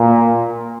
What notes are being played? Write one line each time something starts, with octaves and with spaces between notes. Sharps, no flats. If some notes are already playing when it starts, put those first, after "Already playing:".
Already playing: A#2